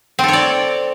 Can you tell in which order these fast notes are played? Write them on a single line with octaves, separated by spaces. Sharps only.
C4 A4 C#5 D5